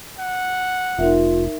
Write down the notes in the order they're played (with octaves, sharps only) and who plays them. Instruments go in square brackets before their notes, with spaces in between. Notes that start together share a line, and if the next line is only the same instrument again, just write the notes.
[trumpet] F#5
[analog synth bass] F1 [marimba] D#4 A#4 E5 [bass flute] F4